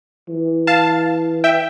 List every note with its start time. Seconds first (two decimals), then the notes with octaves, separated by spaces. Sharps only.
0.29 E3
0.67 F5 A5
1.44 E5 G5